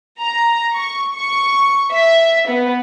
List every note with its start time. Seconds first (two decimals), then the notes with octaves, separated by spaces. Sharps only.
0.20 A#5
0.73 C#6
1.14 C#6
1.92 E5
2.48 B3